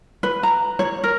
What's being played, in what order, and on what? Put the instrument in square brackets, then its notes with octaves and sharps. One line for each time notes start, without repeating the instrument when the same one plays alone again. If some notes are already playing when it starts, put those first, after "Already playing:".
[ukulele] B4
A#5
C#5
A#4